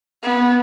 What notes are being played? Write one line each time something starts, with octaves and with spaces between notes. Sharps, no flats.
B3